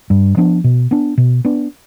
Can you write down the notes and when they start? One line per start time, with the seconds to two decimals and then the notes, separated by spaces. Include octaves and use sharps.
0.10 G2
0.37 F3 B3 D4
0.64 B2
0.91 B3 D4
1.18 B2
1.45 B3 D4